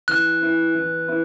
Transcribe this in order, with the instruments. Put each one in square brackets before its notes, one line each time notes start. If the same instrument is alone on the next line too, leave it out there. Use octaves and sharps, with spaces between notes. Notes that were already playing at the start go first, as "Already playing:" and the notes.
[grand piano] E3 [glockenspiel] F#6
[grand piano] B3 E4
E3
B3 E4